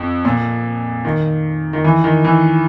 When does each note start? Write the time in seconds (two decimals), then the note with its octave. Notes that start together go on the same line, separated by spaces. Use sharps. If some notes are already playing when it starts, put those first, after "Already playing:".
Already playing: F2
0.25 A#2
1.05 D#3
1.73 D#3
1.84 E3
2.04 D#3
2.24 E3